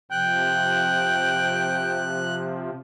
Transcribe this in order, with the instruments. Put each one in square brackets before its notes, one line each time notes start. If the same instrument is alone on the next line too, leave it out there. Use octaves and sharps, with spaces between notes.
[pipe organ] C3 F3 [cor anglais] G5 [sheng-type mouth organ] F#6